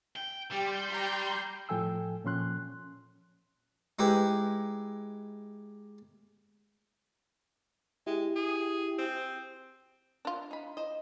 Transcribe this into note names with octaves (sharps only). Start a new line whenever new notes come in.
G5
G3 G4 C6 G6
G4 A#5
A2 F3 A4 G5 G#5 E6
A#2 F3 C#4 C6 F#6
G#3 D#4 E4 G4 B4
G#3 E4 G4
G#4
C4
D4 F4
D#4 B5
C5 D#5